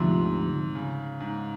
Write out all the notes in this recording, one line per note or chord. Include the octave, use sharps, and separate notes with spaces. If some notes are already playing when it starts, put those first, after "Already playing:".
Already playing: D2 G#2 C3 F3
C#3
G#2